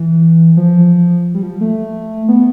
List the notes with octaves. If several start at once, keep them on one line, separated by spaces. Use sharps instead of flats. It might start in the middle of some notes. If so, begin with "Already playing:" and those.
Already playing: E3
F3
G3
F3
A3
B3